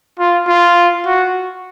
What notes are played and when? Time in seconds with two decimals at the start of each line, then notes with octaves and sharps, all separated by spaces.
0.19 F4
0.47 F4
1.06 F#4